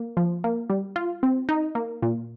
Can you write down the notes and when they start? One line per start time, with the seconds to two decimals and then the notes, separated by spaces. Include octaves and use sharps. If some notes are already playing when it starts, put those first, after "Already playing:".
Already playing: A#3
0.17 F3
0.44 A#3
0.70 G3
0.96 F4
1.23 C4
1.49 D#4
1.75 A#3
2.02 A#2